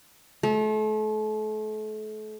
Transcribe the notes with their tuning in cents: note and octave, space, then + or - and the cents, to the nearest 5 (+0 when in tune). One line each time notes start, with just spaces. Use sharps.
A3 -35